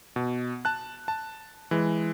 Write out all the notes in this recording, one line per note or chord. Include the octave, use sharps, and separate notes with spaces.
B2
A5 F#6
A5
E3 G#3